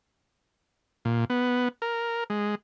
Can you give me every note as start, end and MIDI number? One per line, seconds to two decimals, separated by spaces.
1.05 1.25 46
1.30 1.68 59
1.82 2.24 70
2.30 2.55 56